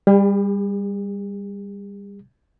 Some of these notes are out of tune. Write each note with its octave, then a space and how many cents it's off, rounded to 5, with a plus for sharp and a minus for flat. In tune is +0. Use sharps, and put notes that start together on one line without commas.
G3 +20 G#4 -40